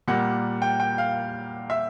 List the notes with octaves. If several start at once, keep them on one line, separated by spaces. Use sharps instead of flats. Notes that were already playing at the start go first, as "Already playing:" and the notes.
A#2 G3 A#3 F#5
G5
G5
F5
E5